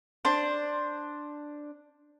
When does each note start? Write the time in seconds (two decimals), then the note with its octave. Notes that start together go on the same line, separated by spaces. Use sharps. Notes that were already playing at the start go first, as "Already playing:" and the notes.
0.25 D4 C5